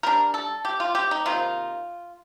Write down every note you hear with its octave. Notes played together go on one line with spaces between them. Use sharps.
G3 D4 A#4
A4
G4
F4
G4
D#4
C3 D#3 A#3 D#4 F4